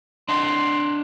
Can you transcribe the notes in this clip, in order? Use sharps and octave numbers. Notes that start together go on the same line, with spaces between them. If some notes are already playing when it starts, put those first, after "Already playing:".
D4 D#5 F#5 C6